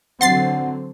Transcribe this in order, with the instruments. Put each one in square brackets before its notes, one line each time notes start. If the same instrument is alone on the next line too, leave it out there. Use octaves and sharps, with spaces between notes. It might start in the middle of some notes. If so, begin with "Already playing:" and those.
[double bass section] D3 F#3 C4 [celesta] F#5 [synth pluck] C6 A6 C7